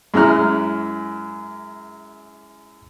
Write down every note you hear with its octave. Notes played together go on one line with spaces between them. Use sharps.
F#2 G#3 C#4 E4 A#5 F6